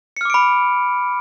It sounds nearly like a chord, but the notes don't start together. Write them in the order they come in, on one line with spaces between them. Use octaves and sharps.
C#7 F6 D6 D7 B5